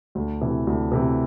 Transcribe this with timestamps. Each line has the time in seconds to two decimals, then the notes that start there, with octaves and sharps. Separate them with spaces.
0.15 D2
0.41 C3 E3
0.67 D2
0.92 C3 E3